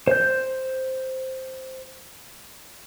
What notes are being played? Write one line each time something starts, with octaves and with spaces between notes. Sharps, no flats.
C5 G6